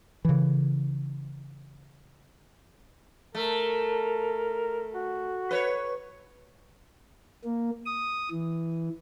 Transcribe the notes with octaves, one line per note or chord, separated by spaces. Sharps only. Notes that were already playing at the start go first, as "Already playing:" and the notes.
C#3 E3
A3 A#4
F#4
B4 C#5
A#3
D#6
E3